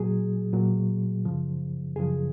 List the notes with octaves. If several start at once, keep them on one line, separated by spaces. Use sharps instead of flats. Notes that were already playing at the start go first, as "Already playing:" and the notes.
Already playing: A#2 F#3 G#4
A#2 F#3
F#2 C#3 F3
F#2 C#3 F3 G#4